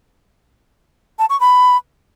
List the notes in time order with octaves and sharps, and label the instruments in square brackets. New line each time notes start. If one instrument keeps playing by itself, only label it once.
[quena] A5
C#6
B5